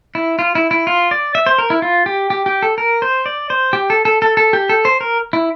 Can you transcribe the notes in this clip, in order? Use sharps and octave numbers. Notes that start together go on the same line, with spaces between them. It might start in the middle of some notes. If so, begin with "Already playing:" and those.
E4
F4
E4
E4
F4
D5
E5
C5
A#4
E4
F4
G4
G4
G4
A4
A#4
C5
D5
C5
G4
A4
A4
A4
A4
G4
A4
C5
A#4
E4